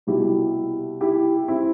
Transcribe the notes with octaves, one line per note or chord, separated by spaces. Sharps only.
C2 B2 G3 E4 G4
E4 G4
C4 E4